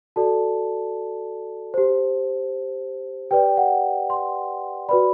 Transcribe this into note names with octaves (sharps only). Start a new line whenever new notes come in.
F#4 A4 D5 A5
G4 C5
G4 B4 D5 G5
F#5
C6
F#4 B4 D5 B5